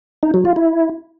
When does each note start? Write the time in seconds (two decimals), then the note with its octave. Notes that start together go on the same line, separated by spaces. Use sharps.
0.23 D#4
0.34 F#3
0.45 F4
0.56 E4